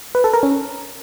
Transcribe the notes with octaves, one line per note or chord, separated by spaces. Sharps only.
B4
A4
A#4
C#4